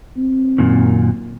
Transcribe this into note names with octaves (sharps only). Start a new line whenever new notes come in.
C4
F#2 A#2 D#3